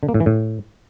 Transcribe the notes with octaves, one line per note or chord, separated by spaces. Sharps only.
D3
A#3
A2
E3
A2